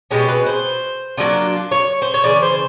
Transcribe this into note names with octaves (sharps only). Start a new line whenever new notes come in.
B2 G#3 C#4 G4
B4
C5
F#3 A#3 D4 F4
C#5
C5
C#5
C#3 E3 D5
C5